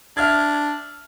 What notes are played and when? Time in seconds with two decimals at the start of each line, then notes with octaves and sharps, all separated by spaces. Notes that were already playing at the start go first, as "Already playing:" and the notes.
0.17 D4 E5 F6 G#6